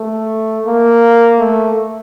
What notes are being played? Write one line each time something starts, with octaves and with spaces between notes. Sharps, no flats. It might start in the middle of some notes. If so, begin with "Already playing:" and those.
Already playing: A3
A#3
A3